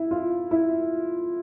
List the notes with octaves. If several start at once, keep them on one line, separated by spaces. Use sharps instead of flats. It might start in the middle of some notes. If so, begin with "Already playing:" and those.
Already playing: E4
F4
E4